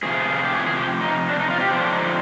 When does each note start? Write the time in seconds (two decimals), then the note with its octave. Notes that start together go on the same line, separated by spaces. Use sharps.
0.03 F2 C3 F3 G#4
0.44 G4
0.55 G#4
0.66 G#4
0.76 G4
1.01 D#4
1.28 D4
1.39 D#4
1.50 F4
1.61 G4
1.71 D3 F3 C4 D4
1.92 D#4